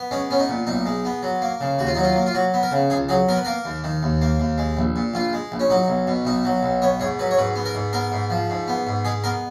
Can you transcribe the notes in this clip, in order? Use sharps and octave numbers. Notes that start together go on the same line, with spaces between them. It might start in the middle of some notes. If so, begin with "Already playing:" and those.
Already playing: B3
G#3 C#4
B3 C#4
D#4
A#2
B1 D#4
G#3
B3
F#3
A#3
C#3
D#2 F#4
F4
F#3 D#4
F4
A#3
F4
F#3 F#4
B3
A#4
C#3
C#2 G#4
F#3 G#4
B3 A#4
B4
A#3 A#4
D#2
D#3
D#2
A#3
D#2
G#3
A#1
A#2
A#1 F4
G#3
A#1
C#4
F#3 D#4
B1
B2
B1 D#4
F#3
B1
B3 C#5
G#2 C#5
F#3 B4
C#5
G#2 B4
B3
A#4
G#2
B3 A#4
G#2
F3
G#2
B3
G#2
G#3 G#4
B3 A#4